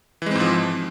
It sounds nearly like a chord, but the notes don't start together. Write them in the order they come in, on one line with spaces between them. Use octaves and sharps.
E3 G#3 C4 G#2 F3